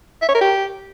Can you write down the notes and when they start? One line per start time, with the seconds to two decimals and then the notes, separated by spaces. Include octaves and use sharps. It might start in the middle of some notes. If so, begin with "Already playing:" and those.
0.22 E5
0.28 C#5
0.35 A#4
0.41 G4